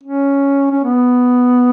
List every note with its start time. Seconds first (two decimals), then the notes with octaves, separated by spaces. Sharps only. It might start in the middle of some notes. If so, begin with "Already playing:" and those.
0.03 C#4
0.71 C#4
0.83 B3